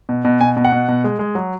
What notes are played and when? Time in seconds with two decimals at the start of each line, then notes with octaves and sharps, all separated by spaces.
0.09 B2
0.25 B2
0.41 B2 G#5
0.57 B2
0.64 F#5
0.72 B2
0.89 B2
1.04 G#3
1.19 G#3
1.35 F#3